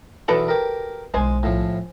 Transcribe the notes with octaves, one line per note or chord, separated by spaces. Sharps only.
B1 E2 F#4 A4 B4 D5
G4 A#4
B1 D#3 G#3 C5 G#5
A2 F3